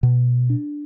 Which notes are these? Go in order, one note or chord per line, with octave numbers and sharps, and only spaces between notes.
B2
D4